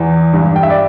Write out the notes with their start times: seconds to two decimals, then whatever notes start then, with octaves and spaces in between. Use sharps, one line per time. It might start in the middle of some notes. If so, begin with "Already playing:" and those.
Already playing: E2 E3
0.33 G2
0.56 G5
0.63 E5
0.70 D5